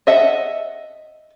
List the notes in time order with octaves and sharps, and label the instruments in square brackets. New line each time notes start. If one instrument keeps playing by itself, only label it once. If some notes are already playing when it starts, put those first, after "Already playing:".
[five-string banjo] D#5 E5 F#5 A5